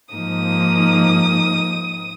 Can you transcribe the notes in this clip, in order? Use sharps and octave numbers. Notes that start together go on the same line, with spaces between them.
G#2 F3 A#3 D#4 D#6